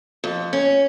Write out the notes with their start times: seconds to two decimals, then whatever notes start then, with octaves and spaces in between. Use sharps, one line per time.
0.24 F2
0.53 C#4